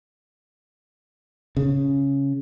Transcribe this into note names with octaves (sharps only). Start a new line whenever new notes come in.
C#3